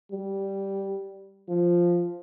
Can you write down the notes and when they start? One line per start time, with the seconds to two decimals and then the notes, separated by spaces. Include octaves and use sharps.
0.12 G3
1.48 F3